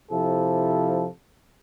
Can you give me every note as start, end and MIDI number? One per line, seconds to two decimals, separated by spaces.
0.11 1.06 48
0.11 1.06 53
0.11 1.06 64
0.11 1.06 69